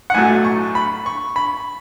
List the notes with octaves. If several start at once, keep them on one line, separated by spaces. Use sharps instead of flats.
F#5
B1 A2 F#3 A3 G#5
C#6
B5
C#6
B5